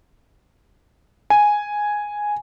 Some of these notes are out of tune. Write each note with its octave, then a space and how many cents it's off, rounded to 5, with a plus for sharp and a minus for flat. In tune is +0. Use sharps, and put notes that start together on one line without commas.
G#5 +0